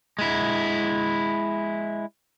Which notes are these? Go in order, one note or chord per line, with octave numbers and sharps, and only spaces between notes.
G#3 E4